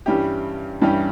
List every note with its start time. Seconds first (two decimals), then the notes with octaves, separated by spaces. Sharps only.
0.06 G2 E3 G3 C#4 G4
0.82 G2 E3 G3 C#4 G4